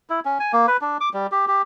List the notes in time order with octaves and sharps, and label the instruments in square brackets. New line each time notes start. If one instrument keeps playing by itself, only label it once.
[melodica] E4
C#4
G#5
A#3
B4
D4
D6
G3
G4
G4